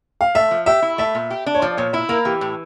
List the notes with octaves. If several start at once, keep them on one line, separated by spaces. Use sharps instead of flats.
F5
A3 E5
F3
G4 E5
E4
A3 E5
A#2
G4
D4
C#5
F3 D5
A#2 C#5
E4 E5
A#3 A#4
E3 G4
A2